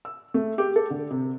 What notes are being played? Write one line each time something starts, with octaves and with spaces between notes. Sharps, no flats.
E6
A3
G4
A4
D3
C3